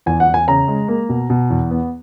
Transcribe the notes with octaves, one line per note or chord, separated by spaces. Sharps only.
E2 G#5
F#5
E2
G#5
C#3 A#5
G#3
A#3
B2
B2
E2
B3